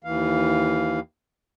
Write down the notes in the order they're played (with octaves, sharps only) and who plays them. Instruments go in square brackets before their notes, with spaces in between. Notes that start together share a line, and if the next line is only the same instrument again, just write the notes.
[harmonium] D#2 E3 F5